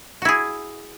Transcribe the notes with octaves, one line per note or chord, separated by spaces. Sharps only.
E4 F#4 G#4